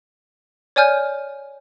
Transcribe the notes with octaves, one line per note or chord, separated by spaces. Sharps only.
C#5 D5 G#5 F6 G6